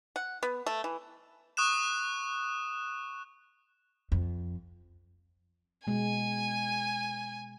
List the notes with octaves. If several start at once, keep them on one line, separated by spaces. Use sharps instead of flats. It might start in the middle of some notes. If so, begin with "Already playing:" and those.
F#5
B3
A3
E3
C#6 D#6 F#6 E7
F2
B2 G#3 G#5